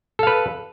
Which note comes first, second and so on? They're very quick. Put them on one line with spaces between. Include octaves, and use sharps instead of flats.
A4 F5 B4